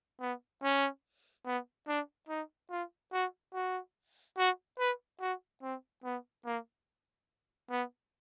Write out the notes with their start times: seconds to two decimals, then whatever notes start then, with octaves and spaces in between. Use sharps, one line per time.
0.21 B3
0.63 C#4
1.46 B3
1.88 D4
2.29 D#4
2.71 F4
3.13 F#4
3.54 F#4
4.38 F#4
4.79 B4
5.21 F#4
5.62 C4
6.04 B3
6.45 A#3
7.71 B3